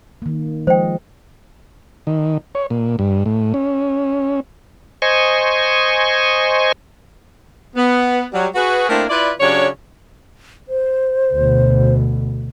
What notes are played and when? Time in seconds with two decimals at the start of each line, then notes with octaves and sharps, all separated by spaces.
0.22 D#3 A#3
0.67 F3 G#3 C5 D#5 G5
2.07 D#3
2.55 C#5
2.70 A#2
2.99 G2
3.26 A2
3.54 C#4
5.02 C5 D#5 G#5 C#6
7.76 B3
8.33 F#3 G3
8.55 F#4 G#4 B4
8.89 A3 A#3 C4 D4 E4 A#4
9.10 E4 F4 B4 D5
9.40 C#3 F#3 D4 G4 C#5
10.69 C5
11.34 D2 B2